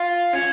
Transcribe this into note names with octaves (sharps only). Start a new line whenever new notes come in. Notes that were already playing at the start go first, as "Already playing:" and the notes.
Already playing: F4
C#4